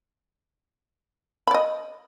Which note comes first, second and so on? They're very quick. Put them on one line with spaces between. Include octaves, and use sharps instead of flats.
B5 D5 D#5